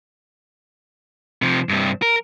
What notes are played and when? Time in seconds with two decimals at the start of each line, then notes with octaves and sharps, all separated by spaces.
1.42 C3 F3
1.69 G2 C3
2.02 A#4